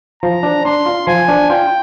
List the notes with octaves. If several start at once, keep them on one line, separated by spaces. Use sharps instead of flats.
F3 A#5
D4
D4 C6
F4
F3 G#5
D4
F4 G5